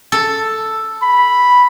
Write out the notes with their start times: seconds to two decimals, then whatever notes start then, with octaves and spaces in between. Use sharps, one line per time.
0.12 A4
1.03 B5